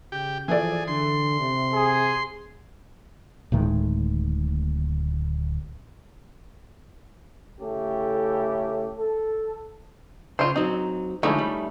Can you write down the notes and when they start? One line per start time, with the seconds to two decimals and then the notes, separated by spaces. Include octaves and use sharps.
0.12 C#3 G4
0.48 E3 F3 G#4 A4 D5
0.88 D3 C6
1.40 C3
1.74 G#4
3.52 D1 A2 D#3 G#3
7.60 C#3 A3 C#4 E4 G4 A4
8.98 A4
10.39 C#3 F4 C5
10.56 F#3 C4 D#4
11.23 D3 F3 G#3 A3 C#4 D#4 E4
11.38 G3